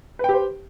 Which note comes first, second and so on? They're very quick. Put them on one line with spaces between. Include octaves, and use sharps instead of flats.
B4 G5 G4 C5